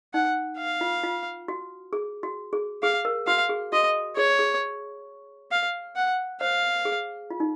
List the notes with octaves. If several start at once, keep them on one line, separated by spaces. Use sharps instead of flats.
D#4 F#5
F5
F4
F4
F#4
G#4
F#4
G#4
G#4 F5
A#4
F#4 F5
G#4
F#4 D#5
G#4 C#5
G#4
F5
F#5
C5 F5
G#4
F4
D#4